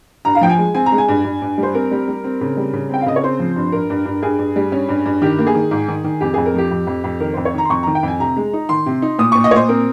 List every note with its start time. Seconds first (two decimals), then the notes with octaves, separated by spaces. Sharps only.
0.25 G2 A#5
0.35 F5
0.41 F3 G5
0.50 G#5
0.58 G#3
0.75 C4 G#5
0.86 A#5
0.92 G#3
0.98 G#5
1.08 G2
1.25 G2
1.42 G2
1.58 G3 C5
1.74 C4 A#4
1.91 G3
2.08 G3
2.24 C4
2.41 C#3
2.57 G3
2.73 C#3
2.90 C4 G5
3.01 F5
3.06 C#3 D#5
3.16 C#5
3.23 C4 C5
3.40 F3
3.56 G2
3.72 G2 A#4
3.90 G2
4.06 G2
4.23 G2 G#4
4.39 G2
4.56 G3
4.72 C#4
4.89 G2
5.06 G2
5.22 D#3 G4
5.39 A#3
5.47 G#4
5.55 D#3
5.71 G#2
5.88 D#3
6.04 D#3
6.21 F2 G4
6.34 F2 G#4
6.46 A#4
6.54 F3 G4
6.71 F2
6.87 F2
7.04 F2
7.20 D#3 A#4
7.33 F2 C5
7.45 C#5
7.54 D#3 A#5
7.65 C6
7.70 F2 C#6
7.83 D#3 A#5
7.95 G5
8.03 F2 G#5
8.20 C3 A#5
8.37 G#3
8.53 D#4
8.69 D#3 C6
8.86 C3
9.02 D#4
9.19 A#2 D#6
9.32 A#2 C#6
9.44 D#5
9.51 A#2 C5 C#5
9.69 C4 A#4